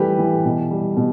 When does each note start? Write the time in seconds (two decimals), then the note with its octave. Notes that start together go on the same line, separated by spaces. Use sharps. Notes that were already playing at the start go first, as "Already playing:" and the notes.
Already playing: A2 E3 G3 G4 A4 B4
0.19 E3
0.45 B2
0.71 G3
0.97 B2